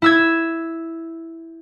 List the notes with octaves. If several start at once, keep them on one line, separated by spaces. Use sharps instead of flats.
E4 E6 G#6